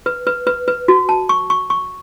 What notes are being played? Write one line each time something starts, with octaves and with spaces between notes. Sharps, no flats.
B4
B4
B4
B4
F#4
A5
C#6
C#6
C#6